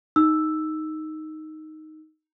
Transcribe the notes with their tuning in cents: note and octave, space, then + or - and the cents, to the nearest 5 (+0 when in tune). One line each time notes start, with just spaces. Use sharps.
D#4 +0 E6 +0